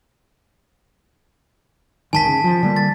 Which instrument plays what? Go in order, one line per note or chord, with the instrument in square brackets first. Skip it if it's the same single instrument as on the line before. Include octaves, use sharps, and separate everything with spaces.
[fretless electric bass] G1 C#2 D#3 [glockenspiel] G#5 A5 B6
[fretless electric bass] C#3
F3
D3 G3 A#3
[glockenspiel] A6